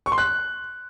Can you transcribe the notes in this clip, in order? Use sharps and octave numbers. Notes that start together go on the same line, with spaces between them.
C#6
C6
F#6